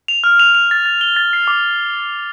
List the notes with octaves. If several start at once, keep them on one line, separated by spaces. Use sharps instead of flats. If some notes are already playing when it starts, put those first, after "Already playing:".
F7
F6
F7
F7
A6
A6
G7
A6
C7
D6